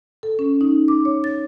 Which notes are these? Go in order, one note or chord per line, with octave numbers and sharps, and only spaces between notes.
A4
C#4
D#4
D6
C#5
A6